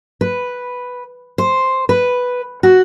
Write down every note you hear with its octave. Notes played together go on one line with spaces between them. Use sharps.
B4
C5
B4
F#4